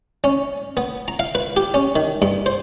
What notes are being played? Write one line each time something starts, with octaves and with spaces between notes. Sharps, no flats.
C#4
B3
A#5
F5
B4
G4
C#4
D#3
G2
C5